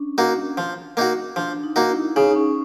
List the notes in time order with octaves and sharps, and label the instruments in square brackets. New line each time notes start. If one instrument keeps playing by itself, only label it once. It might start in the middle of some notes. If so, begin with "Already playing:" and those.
Already playing: [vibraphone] C#4 D4
[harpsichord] A#3 D#4 F#4
F3
A#3 D#4 F#4
[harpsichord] F3 [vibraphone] D4
[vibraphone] D#4
[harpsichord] A#3 D#4 F#4
[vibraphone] E4
[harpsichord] C#3 [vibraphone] D#4
[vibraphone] C#4